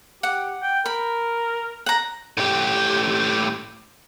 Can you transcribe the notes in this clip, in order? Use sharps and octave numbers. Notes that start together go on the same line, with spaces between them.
G4 F#5
G5
A#4 B5
F#5 A#5
A2 G4